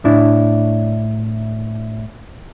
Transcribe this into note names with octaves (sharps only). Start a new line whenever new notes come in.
A2 D4 E4